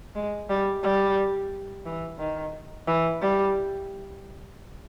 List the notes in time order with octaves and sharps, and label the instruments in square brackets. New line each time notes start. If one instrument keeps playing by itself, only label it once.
[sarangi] G#3
G3
G3
E3
D#3
E3
G3